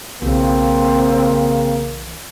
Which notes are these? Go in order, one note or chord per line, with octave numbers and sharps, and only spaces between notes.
B1 C#3 E3 A#3 C4